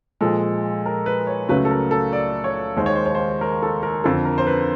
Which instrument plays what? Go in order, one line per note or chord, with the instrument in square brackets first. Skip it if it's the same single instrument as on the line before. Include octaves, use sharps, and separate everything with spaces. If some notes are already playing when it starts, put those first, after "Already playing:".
[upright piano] A#2 F3 G#3 A4
A#4
B4
C#5
C#2 C#3 F#3 A3 B4
A4
A#4
A4
D5
C#5
D#2 D#3 G#3 C5
C#5
C5
C#5
C5
A#4
A4
A#4
F2 D3 F3 A4
A#4
C5
B4